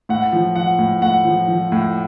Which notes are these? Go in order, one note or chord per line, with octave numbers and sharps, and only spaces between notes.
A2 F#5
F3
F3 F#5
A2
A2 F#5
F3
F3
A2